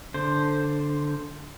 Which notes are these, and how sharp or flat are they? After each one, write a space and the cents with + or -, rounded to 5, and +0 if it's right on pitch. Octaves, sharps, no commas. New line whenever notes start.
D3 +0 C5 +0